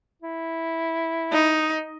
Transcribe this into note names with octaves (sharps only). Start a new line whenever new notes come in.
E4
D#4